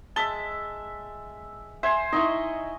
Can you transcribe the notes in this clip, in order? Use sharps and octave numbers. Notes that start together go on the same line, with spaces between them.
G#3 E5 A5 A6 G7
C5 E5 G#5
D#4 E4 D#5 C6 C#6